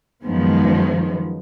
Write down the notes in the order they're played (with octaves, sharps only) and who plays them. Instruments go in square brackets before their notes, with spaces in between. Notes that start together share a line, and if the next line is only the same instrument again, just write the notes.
[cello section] F#2 D#3 F3 G#3 B3